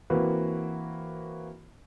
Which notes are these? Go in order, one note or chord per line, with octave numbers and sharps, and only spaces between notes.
E3 A#3 C4 F#4 B4